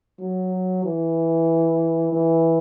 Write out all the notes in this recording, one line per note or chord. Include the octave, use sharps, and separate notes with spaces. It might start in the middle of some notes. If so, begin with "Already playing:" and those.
F#3
E3
E3